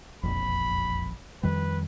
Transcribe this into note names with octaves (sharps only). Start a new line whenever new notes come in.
E1 A#1 F2 B5
F2 D#3 G3 B4